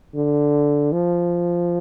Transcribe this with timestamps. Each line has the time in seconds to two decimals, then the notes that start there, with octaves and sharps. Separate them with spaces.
0.15 D3
0.92 F3